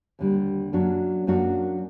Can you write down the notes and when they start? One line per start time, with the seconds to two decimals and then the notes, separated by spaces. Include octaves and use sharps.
0.19 D#2 D3 G3 A#3
0.73 F#2 F#3 A#3 D4 F#4
1.27 F#2 F#3 A#3 D4 F#4